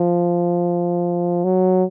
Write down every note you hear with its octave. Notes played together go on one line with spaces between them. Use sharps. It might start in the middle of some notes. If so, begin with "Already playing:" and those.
Already playing: F3
F#3